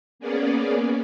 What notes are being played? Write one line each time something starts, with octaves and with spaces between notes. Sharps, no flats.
A#3 B3 C#4 G#4 D5